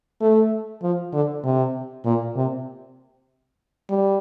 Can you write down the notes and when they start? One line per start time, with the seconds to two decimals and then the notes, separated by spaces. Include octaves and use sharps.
0.21 A3
0.82 F3
1.13 D3
1.44 C3
2.05 A#2
2.36 C3
3.89 G3